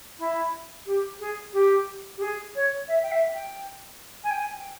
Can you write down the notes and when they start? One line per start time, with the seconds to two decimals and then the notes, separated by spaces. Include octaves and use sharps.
0.19 E4
0.86 G4
1.20 G#4
1.53 G4
2.17 G4
2.21 G#4
2.55 C#5
2.88 E5
3.02 G5
3.11 E5
3.34 G5
4.24 G#5
4.30 G5
4.38 G#5
4.57 G5